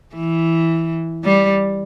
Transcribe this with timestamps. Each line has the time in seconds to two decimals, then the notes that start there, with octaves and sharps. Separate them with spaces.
0.15 E3
1.24 G3